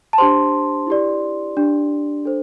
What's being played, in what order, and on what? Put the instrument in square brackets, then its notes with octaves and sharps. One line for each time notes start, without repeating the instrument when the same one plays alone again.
[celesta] A5
D4 G4 C5 C6
E4 G4 D5
D4 G4 D5
D4 A4 C5